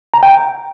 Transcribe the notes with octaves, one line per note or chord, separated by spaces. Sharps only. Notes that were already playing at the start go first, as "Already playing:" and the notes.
A#5
G5